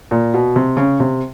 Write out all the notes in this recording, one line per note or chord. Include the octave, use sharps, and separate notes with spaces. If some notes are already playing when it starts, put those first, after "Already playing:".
A#2
B2
C3
C#3
C3